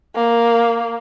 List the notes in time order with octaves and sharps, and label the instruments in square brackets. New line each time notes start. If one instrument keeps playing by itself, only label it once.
[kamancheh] A#3